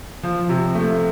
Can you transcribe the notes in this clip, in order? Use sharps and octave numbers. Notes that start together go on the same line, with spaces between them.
F3
C3
A3